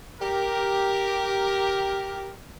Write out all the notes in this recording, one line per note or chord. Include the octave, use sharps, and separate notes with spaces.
G4 A#4